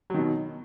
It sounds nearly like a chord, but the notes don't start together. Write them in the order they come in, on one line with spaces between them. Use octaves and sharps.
F#3 D#3 B2